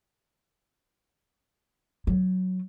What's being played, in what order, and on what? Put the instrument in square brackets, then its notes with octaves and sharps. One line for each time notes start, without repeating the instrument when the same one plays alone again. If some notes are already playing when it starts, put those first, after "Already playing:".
[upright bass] F#3